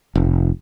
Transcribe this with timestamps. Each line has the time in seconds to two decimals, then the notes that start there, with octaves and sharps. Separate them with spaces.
0.15 F1